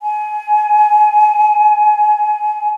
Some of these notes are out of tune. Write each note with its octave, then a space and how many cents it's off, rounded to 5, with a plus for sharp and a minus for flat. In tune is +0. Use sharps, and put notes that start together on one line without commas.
G#5 +20